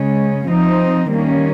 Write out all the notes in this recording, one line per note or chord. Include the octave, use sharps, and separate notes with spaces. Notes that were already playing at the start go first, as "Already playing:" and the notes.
Already playing: C#3 G#3 C#4
F3 C4 D#4
D#3 G3 A#3 C#4